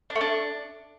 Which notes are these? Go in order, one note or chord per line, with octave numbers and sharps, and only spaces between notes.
D4
A3
D4